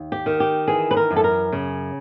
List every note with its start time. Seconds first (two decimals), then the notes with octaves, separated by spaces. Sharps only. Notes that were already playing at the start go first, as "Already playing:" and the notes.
Already playing: D#2
0.12 G4
0.26 D#3
0.40 G4
0.68 E3 G#4
0.91 B4
0.97 A#4
1.11 F#2
1.16 A4
1.24 A#4
1.52 C#3